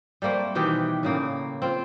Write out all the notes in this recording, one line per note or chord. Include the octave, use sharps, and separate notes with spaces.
G3 A3 A#3 C4
B2 D#3 E3 G4
A2 C#3 A#3
C4 F4